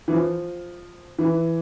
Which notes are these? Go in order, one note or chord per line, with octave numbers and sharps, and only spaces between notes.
E3
F3
E3